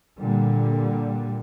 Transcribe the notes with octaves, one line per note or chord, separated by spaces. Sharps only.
A#2 D3 G3